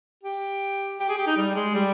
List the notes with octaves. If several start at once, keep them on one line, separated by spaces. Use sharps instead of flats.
G4
G4
G#4
G4
D#4
G3
G#3
G3